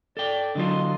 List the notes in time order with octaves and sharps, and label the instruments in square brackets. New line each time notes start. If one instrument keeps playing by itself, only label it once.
[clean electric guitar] A4 G5 [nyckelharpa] D5
[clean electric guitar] D3 F#3 F4 [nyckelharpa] D#5 C6